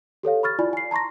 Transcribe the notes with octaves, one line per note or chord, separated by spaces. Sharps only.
G4 A4 C#5 F5
B5 C#6 F6 A6
E4 F4 D5 G#5 B5
G#5 C7
A5 A#5 C6 C#6 A#6